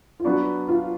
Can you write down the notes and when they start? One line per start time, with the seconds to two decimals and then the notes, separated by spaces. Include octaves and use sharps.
0.20 F4
0.24 F#3 B3 D4 F#4
0.68 F4